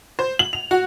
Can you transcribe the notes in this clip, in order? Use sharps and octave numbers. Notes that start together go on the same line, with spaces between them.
C5
F#7
F7
F#4